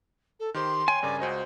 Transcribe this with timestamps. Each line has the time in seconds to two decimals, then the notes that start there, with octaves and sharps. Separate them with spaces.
0.40 A4
0.54 D#3 G4 C5 C6
0.88 C#5 G5 G#5
1.03 G2 C#3 A#4 D5
1.20 C#2 F#4 C5 D#5